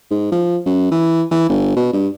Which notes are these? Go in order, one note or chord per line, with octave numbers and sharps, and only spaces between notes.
G#2
F3
F#2
E3
E3
G1
B2
G2